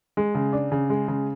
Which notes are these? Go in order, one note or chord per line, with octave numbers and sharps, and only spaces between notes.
G#3
C#3
D4
C#3
G#3
C#3